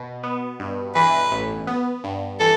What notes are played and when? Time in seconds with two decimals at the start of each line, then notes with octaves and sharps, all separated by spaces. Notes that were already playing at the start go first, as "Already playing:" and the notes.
Already playing: B2
0.23 B3
0.60 G2
0.95 E3 B4
1.32 A1
1.67 B3
2.04 G2
2.40 E3 A4